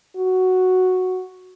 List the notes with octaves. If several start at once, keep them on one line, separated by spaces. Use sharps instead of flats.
F#4